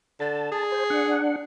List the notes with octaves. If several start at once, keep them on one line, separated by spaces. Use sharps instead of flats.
D3 A5
G#4
C5
D4 F#5